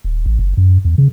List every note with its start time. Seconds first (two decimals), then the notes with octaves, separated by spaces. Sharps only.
0.04 D#1
0.26 A1
0.39 F#1
0.57 F#2
0.85 E2
0.98 C#3